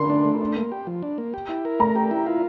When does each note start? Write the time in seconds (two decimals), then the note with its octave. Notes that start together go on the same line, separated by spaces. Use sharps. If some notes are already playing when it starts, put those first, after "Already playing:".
Already playing: D3 C6
0.10 D4
0.25 A3
0.41 D4
0.56 A#3
0.72 G4
0.87 F3
1.03 D4
1.18 A#3
1.34 G4
1.49 E4
1.65 A#4
1.80 A3 A#5
1.96 G4
2.11 E4
2.27 F4